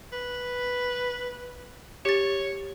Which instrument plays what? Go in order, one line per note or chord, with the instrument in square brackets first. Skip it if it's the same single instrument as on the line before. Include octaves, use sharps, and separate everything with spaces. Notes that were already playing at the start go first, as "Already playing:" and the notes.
[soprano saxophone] B4
[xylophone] G4 A6 [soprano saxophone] C#5